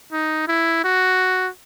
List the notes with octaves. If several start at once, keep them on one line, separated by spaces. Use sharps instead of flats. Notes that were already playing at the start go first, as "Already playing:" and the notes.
D#4
E4
F#4